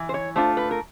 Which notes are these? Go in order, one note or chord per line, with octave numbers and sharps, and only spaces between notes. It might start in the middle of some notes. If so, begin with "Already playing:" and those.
Already playing: E3
C5
C#5
A3 D4 F4 C5
B4
A#4